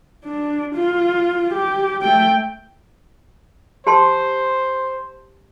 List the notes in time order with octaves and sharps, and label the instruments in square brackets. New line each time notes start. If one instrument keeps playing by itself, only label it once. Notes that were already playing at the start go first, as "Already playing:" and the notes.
[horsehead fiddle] D4
F4
G4
A3 G5
[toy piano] G4 A5 C6 [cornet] C5